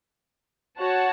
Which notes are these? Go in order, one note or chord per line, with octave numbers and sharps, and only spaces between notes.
F#4 C#5 F#5 A5